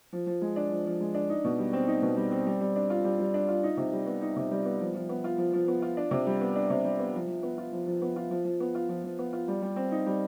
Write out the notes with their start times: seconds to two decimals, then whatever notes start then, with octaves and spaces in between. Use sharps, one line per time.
0.13 F3
0.27 F3
0.42 G#3
0.56 D4
0.71 F3
0.85 F3
1.00 G#3
1.14 D4
1.30 D#4
1.44 B2
1.59 G3
1.73 C4
1.88 D#4
2.02 B2
2.17 G3
2.32 C4
2.47 G3
2.61 G3
2.76 D4
2.90 F4
3.04 G3
3.20 G3
3.34 D4
3.49 F4
3.63 D#4
3.77 C3
3.93 G3
4.07 B3
4.22 D#4
4.36 C3
4.51 G3
4.65 B3
4.80 F3
4.94 F3
5.09 B3
5.24 F4
5.38 F3
5.53 F3
5.68 B3
5.82 F4
5.97 D4
6.11 C3
6.27 G3
6.41 B3
6.56 D4
6.70 C3
6.85 G3
6.99 B3
7.14 F3
7.28 F3
7.43 B3
7.58 F4
7.72 F3
7.87 F3
8.02 B3
8.16 F4
8.31 F3
8.45 F3
8.60 B3
8.75 F4
8.89 F3
9.04 F3
9.19 B3
9.33 F4
9.48 G3
9.62 G3
9.76 C4
9.92 D#4
10.06 G3